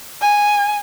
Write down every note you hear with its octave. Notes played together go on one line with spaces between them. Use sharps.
G#5